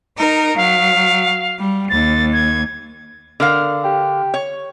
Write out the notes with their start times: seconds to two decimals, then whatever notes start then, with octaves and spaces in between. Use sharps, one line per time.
0.16 D#4 A#4
0.56 F#3 F5
1.57 G3
1.90 D#2 A6
2.33 G#6
3.40 D3 A#4 F5
3.84 G4
4.34 C#5